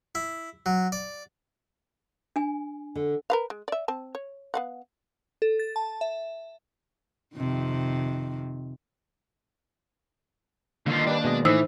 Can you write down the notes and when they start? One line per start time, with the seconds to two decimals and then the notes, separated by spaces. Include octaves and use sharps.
0.15 E4
0.66 F#3
0.92 D5
2.36 D4 G#5
2.96 D3
3.30 A#4 B4 F5
3.50 G#3
3.68 D5 E5
3.88 C4 A5
4.15 C#5
4.54 B3 F5 F#5
5.42 A4
5.59 A6
5.76 A5
6.01 E5
7.36 F2 C3 D#3
10.86 D3 D#3 A#3 F4 F5
11.07 G3 D4 B4 D5
11.24 B2 G#3 D#5
11.45 A2 E3 D#4 C5 E6